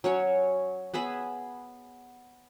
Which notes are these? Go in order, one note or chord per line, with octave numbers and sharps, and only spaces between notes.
F#3 C#4 C#5
B3 G#4 E5 B5